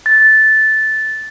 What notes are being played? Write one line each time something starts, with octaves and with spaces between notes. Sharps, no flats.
A6